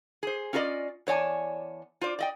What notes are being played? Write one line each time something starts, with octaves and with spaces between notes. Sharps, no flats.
G#4 C5
C#4 F4 A4 A#4 D5 D#5
E2 C#5 D5 G#5 A5
F4 C5 D5
D5 D#5 G5